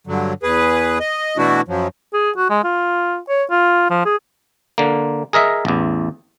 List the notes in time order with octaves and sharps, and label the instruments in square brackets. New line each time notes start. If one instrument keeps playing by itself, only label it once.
[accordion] G2 D3 F#3
E2 G#4 B4
D#5
B2 E3 A3 D4 E4 F#4
F#2 F3 F#3
[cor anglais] G#4
F#4
G#3
F4
C#5
F4
F3
G#4
[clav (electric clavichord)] D3 A#3
G#4 A#4 D#5 E5
A1 E2